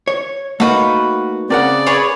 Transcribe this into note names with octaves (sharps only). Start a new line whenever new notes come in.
C#5
A3 A#3 D#4 F#4 B4
C#3 C4 A#4 D5 F#5
G#4 B4 C#5